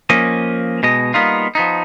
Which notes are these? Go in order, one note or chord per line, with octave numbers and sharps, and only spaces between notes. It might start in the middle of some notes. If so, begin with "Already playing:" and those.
F3 A#3 C#4 D#5
B2 G#3 D#5
G3 A#3 B3 D#4 F4
F3 B3 D#4